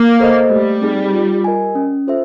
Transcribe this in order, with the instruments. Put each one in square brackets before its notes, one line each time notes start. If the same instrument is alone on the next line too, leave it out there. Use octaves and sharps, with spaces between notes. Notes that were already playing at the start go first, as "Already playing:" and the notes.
Already playing: [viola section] A#3
[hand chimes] A4 C5 D#5
[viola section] G3 [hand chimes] A3
[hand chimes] C4 D#4 G#4
F4
A#4 D#5 G#5
C#4
F4 A4 C5 E5